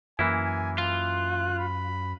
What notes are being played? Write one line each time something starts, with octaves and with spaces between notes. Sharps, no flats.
F#2 E3 A#3 E4 G#5
F4 F#6
B5